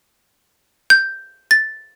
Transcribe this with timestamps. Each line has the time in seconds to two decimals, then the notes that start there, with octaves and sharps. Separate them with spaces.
0.90 G6
1.51 A6